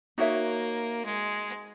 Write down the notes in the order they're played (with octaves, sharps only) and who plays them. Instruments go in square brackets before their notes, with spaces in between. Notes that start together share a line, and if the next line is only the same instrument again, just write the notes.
[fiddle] A#3 [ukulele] D#4 F#4 C#5 E5
[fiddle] G#3